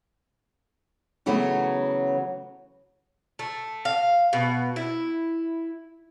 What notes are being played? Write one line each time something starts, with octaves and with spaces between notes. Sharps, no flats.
C#3 E3 F#3 A3 B3
A3
F5
B2
E4